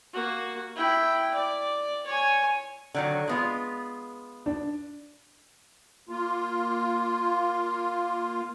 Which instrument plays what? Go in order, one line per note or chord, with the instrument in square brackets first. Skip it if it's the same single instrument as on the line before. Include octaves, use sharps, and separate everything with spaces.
[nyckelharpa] A#3 F#4
E4 G5
D5
C#5 G#5
[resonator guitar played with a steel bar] D3 D#3 F#3
G#3 B3 F4
[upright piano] D4
[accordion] A#3 F4